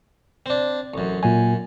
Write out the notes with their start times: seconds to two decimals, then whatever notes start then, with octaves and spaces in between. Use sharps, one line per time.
0.46 C4 D4
0.94 A1 F#2
1.23 F#2 A#2 G#5